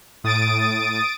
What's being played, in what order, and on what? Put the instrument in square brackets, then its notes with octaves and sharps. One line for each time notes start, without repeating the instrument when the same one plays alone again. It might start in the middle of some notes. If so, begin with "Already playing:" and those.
[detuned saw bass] A2 [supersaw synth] D#6 A6 D7